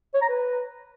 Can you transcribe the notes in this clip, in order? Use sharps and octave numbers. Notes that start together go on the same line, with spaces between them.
C#5
A#5
B4